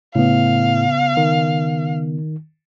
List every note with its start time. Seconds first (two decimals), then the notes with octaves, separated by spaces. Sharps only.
0.15 A2 C#3 B3 F5
1.17 D#3